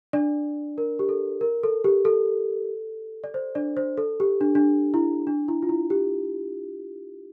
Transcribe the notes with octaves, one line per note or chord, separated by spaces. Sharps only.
D4 D5
A#4
G4
A4
A#4
A4
G4
A4
D5
C5
D4 D5
C5
A4
G4
D4
D4
E4
D4
E4
F4
E4
G4